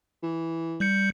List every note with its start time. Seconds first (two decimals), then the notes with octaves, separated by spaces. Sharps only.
0.23 E3
0.80 G3 G6 C#7